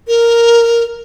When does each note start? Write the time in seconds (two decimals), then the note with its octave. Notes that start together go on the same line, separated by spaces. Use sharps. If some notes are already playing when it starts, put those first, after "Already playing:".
0.07 A#4